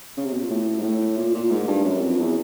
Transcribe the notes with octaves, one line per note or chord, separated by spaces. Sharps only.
C#3
C3
B2
A#2
A2
G#2
A2
A#2
A#2
G#2
G2
F#2
F2
E2